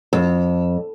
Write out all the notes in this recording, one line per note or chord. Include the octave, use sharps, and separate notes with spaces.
F2